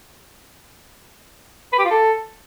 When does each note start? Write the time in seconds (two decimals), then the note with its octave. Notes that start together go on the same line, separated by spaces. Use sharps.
1.73 B4
1.79 G4
1.85 F4
1.91 A4